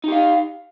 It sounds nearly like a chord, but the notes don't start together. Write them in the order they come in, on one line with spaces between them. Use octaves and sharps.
D#4 G4 F5